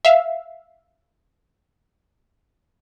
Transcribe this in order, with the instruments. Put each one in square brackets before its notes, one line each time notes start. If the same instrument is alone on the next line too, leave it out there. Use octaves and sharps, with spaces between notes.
[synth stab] E5 F5